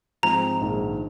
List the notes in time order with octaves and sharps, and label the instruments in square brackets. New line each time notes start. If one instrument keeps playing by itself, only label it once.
[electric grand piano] G#2 F3 G#3 C4 [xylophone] A#5
[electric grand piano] A#1 G#2 D#3